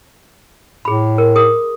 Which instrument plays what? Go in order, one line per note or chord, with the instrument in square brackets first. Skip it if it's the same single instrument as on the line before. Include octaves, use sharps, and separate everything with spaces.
[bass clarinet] A2 [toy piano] G#4 B5
[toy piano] A#4
G#4 A#4 D#6